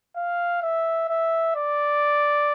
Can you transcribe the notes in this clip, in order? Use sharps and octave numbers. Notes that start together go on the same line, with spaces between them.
F5
E5
E5
D5